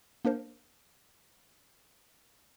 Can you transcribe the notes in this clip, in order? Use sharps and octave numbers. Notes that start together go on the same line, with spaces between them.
A#3 D4 A#4 C5